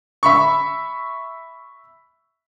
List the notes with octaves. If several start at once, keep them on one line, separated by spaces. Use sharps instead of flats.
E5 B5 C#6